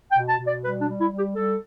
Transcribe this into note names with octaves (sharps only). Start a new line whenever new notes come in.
G5
B2
A5
B2
D5
G3 B4
D4
G3
E4
G3
G4
G3 A4